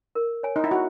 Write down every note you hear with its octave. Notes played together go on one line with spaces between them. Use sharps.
A#4
C#5 G#5
D#4
E4
F#4 G#4